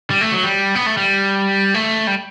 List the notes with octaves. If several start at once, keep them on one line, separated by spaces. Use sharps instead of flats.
G3
A3
F#3
G3
B3
A3
G3
A3
G3